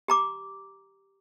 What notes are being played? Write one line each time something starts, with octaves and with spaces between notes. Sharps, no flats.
G4 A#5 D6